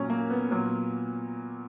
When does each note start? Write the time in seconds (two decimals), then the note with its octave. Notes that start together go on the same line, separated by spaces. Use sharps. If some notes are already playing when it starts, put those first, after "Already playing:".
Already playing: A#2 F#3 C#4
0.10 A#3
0.30 B3
0.51 A#2 F#3